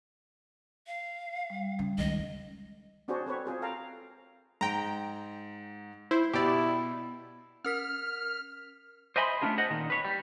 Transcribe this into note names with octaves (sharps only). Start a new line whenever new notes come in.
F5
G3
C#3
C#2 D#3 D#5
C4 D4 F#4 G#4 C5 C#5
C4 A4 B4 C#5
C4 F4 G#4 C5
A4 A#4 F5 G5 A5 A#5
G#2 G5 A#5
E4 C5
B2 E4 G4 D5
C#4 A#4 F6 B6
C5 D#5 E5 G#5 B5 C6
A3 B3 C#4 D4 F4 G#4
G#4 C5 D#5 F#5
A#2 D#3
B4 C#5
G3